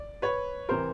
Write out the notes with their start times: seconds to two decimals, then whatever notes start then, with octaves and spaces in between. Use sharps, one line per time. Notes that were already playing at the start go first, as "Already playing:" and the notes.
Already playing: D5
0.22 B4 C#5
0.69 C3 E3 A#4 C5